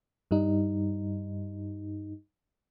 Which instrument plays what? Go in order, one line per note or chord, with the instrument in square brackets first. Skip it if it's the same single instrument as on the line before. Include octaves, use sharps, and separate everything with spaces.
[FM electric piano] G2 G3 D#4